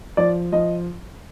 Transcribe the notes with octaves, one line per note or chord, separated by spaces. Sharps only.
F3 D5
F3 D#5